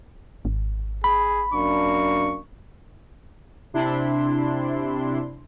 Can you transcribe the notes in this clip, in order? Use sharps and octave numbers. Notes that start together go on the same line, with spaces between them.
G#1
G#4 B5
F#2 A#3 D4 C#6
C3 D4 E4 C6